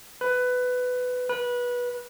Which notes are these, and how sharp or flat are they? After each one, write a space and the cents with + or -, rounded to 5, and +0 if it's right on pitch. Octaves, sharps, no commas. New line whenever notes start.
B4 +15
B4 -20